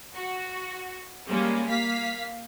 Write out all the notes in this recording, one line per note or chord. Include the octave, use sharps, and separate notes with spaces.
F#4
G3 G#3 A#3 C#4
A#3 F5 B6